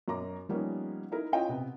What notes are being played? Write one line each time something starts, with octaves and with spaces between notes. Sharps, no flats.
F#2 B2 A#5 D6
F3 G3 A#3 B3 C#4 D#4
D#4 E4 A#4
C#4 E4 F4 D#5 G5
C3 B3